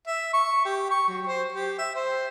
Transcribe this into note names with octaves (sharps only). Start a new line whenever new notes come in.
E5
C#6
G4
C#6
F#3
C5
G4
E5
C5